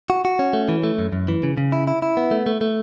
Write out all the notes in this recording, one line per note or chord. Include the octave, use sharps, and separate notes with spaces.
F#4
F#4
C#4
A3
E3
A3
F#2
F#2
E3
C#3
C#3
E4
E4
E4
B3
A3
A3
A3